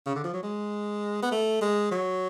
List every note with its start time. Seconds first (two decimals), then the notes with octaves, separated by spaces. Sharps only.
0.06 C#3
0.16 D3
0.24 F3
0.34 F#3
0.43 G#3
1.22 B3
1.32 A3
1.61 G#3
1.91 F#3